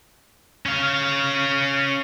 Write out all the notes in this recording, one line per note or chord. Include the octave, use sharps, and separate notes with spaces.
C#4 F5